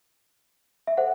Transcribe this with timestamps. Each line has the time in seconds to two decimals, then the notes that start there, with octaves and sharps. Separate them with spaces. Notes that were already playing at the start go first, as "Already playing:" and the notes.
0.87 E5
0.97 A4 C5 F#5